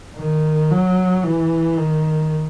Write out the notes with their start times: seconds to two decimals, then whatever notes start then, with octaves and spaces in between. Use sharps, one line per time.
0.16 D#3
0.71 F#3
1.24 E3
1.78 D#3